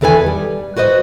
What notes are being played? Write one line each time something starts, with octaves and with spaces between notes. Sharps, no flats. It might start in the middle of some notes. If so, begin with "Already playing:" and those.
E2 D#3 A4 B4 C5 G#5
G3
F#4 B4 C5 D#5